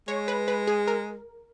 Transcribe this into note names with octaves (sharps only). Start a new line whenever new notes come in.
G#3 C#5
B4
B4
G#4
A#4